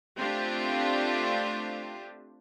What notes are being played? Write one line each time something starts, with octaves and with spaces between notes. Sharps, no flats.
A3 C4 D4 F4 G4